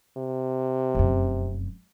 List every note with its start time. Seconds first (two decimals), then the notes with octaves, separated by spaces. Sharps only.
0.17 C3
0.95 F1 F#2